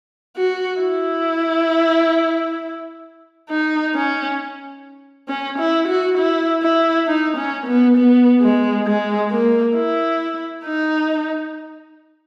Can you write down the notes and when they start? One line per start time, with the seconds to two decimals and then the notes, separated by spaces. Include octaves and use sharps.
0.37 F#4
0.81 E4
3.50 D#4
3.95 C#4
5.29 C#4
5.59 E4
5.88 F#4
6.18 E4
6.63 E4
7.07 D#4
7.37 C#4
7.67 B3
7.97 B3
8.42 G#3
8.87 G#3
9.31 A#3
9.76 E4
10.65 D#4